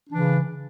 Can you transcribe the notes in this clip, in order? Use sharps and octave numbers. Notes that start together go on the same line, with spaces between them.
C#3 E3 D4